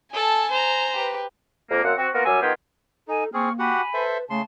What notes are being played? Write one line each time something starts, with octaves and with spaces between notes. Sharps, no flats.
A4 G#5 A5
C5 A#5
G4 B4
F2 A#3
F#2 A#3 C4 F#5
C4 F#4
A#3 B3 F4 F#4 A#4
F#2 F#3 G3 G#5 E6
D#3 B3 F4 G4 G#4
D#4 A4 G#5
A#3 C4 G#4 C#6 F6
F#4 G4 F#5 G#5 B5
A4 B4 C5 E5
C#3 A3 A5 C6